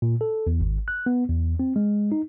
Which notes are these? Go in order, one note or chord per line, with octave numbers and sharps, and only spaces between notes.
A#2
A4
E2
G#1
F#6
B3
E2
C4
G#3
D#4